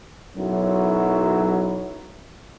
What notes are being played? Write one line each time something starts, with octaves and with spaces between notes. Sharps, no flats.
B1 F#2 F#3 E4